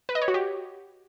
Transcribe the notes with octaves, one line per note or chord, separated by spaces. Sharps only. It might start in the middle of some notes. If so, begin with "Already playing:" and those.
B4
D#5
C#5
F#4
G4